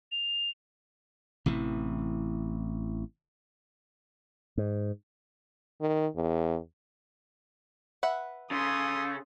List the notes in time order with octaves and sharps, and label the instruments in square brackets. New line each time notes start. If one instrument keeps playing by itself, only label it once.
[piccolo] F7
[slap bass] A1 C3 E3
G#2
[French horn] D#3
E2
[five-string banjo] B4 E5 F#5
[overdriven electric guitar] C#3 [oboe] A4 [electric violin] C6 D#6